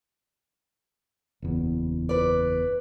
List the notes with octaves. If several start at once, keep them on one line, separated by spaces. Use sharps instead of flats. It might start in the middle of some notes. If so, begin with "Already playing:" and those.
F#1 E2
B4 D5